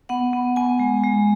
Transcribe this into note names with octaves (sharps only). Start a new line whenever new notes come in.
B3 F#5
B3
B3 G#5
G#3
G#3